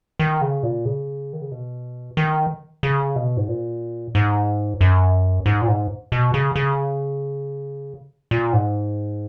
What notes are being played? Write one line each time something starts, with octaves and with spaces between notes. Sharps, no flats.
D#3
C#3
A#2
C#3
D#3
C#3
B2
D#3
C#3
B2
G#2
A#2
G#2
F#2
G#2
A#2
G#2
B2
C#3
C#3
A#2
G#2